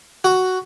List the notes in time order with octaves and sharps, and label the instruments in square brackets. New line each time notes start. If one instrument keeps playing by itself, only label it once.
[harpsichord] F#4